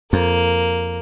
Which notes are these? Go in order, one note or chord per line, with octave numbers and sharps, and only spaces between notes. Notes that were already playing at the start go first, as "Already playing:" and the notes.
F2 A#3